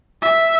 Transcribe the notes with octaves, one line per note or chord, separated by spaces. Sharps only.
E5